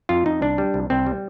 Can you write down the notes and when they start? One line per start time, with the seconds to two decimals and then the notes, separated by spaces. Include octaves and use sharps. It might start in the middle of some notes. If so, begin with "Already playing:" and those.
0.09 F2 F4
0.26 F2 D#4
0.42 C2 D4
0.58 G3
0.74 C2
0.90 C2 C4
1.07 G3